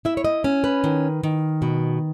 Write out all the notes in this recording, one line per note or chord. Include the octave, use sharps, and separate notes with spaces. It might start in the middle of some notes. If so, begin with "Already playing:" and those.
E4 E5
C#5
D#5
C#4
B4
D#3
D#3
B2